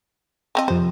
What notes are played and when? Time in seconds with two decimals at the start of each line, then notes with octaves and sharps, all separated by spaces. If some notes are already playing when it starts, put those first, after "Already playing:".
0.55 F3 C4 D#5
0.68 F2 C3 C5